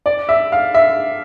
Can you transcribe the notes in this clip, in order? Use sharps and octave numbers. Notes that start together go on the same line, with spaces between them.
D5
E5
F5
E5